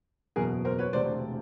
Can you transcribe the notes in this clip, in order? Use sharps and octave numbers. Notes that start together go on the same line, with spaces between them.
F#1 E2 B2 G#4 A#4
A#4 C5
B4 C#5
E1 D2 C3 C5 D5